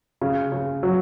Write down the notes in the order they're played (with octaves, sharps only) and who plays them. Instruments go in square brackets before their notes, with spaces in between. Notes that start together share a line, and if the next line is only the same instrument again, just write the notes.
[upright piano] C#3
C#3
F#3